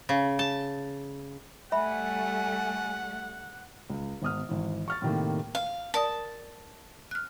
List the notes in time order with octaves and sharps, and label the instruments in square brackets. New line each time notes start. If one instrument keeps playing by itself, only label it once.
[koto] C#3
A5
[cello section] G3 A3 [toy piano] E5 B5 [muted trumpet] F#5 [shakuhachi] G#5
[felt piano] C#2
G#1 B3 D#6 F6
G#1 E3
C#6 F6 A6
A2 C3 D#3 A3 A#3
[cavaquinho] F5
[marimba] A#4 D5 D#6 [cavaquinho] A5
[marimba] F6 F#6